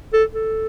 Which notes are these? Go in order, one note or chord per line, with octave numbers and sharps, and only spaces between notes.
A4
A4